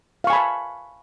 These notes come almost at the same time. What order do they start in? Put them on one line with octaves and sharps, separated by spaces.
F5 C#6 G#5 B5 A5